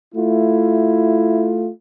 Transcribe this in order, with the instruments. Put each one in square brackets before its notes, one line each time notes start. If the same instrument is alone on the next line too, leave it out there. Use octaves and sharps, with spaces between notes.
[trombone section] A3 E4 F4